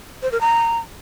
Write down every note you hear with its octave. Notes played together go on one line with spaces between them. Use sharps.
C5
A#4
A#5